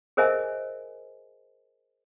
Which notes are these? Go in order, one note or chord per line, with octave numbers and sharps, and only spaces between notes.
G#4 A#4 C5 D#5 E5 G#5